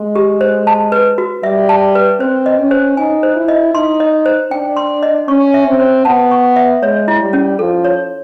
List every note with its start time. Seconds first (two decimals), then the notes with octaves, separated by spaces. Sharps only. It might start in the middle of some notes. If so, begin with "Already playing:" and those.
Already playing: G#3
0.15 G4
0.41 C5
0.67 A5
0.92 B4
1.18 F#4
1.43 G3 E5
1.69 A5
1.95 B4
2.20 C4 C5
2.46 D#5
2.59 C#4
2.71 C5
2.97 D#4 G#5
3.23 C5
3.36 E4
3.48 D#5
3.74 D#4 C6
4.00 D#5
4.26 C5
4.51 D4 G5
4.77 C6
5.03 D#5
5.28 C#4 C#6
5.54 E5
5.67 C4
5.80 C5
6.05 B3 A5
6.31 C#6
6.56 E5
6.82 G#3 C#5
7.08 E4
7.21 G3
7.33 C#4
7.59 F3 A4
7.84 C#5